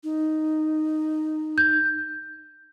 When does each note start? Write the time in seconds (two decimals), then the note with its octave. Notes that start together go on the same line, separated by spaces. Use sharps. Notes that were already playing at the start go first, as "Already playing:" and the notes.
0.04 D#4
1.58 G6